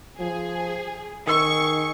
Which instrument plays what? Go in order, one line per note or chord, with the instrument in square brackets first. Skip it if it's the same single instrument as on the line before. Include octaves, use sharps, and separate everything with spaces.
[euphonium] F3 [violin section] G#4
[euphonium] D#3 [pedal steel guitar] G#4 E6 [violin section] C#6